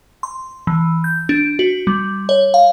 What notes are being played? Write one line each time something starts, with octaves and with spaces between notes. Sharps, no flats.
C6
E3
G6
D4
F#4
G3
C#5
F5